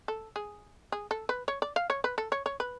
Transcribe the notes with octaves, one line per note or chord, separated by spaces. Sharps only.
A4
G#4
G#4
A4
B4
C#5
D5
F5
C#5
B4
A4
C#5
C#5
B4